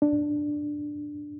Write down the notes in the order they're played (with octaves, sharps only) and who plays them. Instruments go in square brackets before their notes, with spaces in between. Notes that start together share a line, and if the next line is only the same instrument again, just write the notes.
[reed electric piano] D4